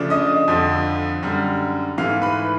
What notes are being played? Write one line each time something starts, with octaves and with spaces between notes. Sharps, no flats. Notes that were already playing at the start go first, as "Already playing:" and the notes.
Already playing: C#3 F3 A3 D4
D#5 D#6
F2 D3 F3
F#2 D3 G3
G#2 E3 A3 F5 F6
B4 B5